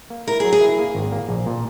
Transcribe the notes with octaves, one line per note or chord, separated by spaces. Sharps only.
A#3
E4 A#4
G#4
F#3
G#4
E4
A#3
G#1
A#3
A#1
A#2